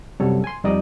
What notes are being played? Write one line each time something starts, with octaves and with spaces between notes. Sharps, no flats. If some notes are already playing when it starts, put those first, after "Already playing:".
F#2 C3 F#3 G3 A4 C#5
G#5 C6
F2 G3 D#4 D5 D#5 D#6